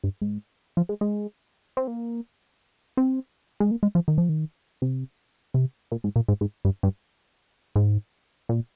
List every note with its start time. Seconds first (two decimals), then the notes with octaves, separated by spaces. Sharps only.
0.04 G2
0.22 G#2
0.77 F3
0.89 G#3
1.01 G#3
1.77 C4
1.88 A#3
2.97 C4
3.60 G#3
3.71 A#3
3.83 G#3
3.95 F3
4.08 D#3
4.18 F3
4.29 D#3
4.82 C3
5.54 C3
5.92 A#2
6.04 G#2
6.16 A#2
6.28 G#2
6.41 G#2
6.65 G2
6.83 G2
7.76 G#2
8.49 A#2